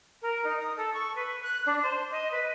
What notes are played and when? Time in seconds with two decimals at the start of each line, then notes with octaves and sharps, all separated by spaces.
0.22 A#4
0.44 D#4
0.59 D#6
0.76 A4
0.94 C#6
1.15 B4
1.42 F#6
1.66 D4
1.82 C5
2.11 D#5
2.31 B4